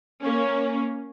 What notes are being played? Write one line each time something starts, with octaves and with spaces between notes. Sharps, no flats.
A#3 C#4